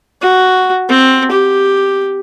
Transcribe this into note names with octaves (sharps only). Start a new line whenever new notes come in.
F#4
C4
G4